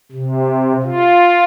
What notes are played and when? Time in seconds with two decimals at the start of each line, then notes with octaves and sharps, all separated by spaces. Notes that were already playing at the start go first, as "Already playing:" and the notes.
0.12 C3
0.83 F4